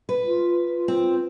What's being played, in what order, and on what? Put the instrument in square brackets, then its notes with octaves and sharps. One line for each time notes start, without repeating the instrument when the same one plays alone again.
[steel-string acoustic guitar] B4
[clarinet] F4
F4
[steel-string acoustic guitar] C4